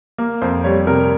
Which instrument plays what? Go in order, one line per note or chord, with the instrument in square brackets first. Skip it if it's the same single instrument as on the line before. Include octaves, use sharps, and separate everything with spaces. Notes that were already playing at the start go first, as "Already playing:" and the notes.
[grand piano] A#3
F2 C5
G3 C#5
C3 A#4